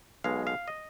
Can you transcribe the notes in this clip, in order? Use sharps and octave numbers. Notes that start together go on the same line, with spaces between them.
B1 B2 G#3 F5
F5
D#5